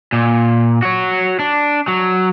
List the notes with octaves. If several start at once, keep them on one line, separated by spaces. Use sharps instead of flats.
A#2
F#4 C#5
D4
F#3